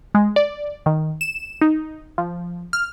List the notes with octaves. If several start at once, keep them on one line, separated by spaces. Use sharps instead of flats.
G#3
D5
D#3
E7
D#4
F3
F6